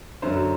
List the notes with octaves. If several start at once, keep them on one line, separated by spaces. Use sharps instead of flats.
F#2 D3 F#3 C5